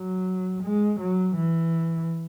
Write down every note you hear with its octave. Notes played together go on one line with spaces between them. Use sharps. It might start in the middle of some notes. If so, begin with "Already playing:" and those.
Already playing: F#3
G#3
F#3
E3